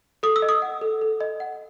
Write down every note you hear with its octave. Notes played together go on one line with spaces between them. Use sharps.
A4 D#6
E6
D#5
D#6
F#5
A4
A4
D#5
F#5